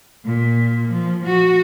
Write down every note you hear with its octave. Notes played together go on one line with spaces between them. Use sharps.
A#2
F3
F#4